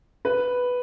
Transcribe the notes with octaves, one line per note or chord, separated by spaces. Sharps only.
B4